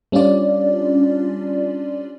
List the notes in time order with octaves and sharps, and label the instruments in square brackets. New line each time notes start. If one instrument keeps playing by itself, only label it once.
[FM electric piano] G3 C#4 D4 F4 D5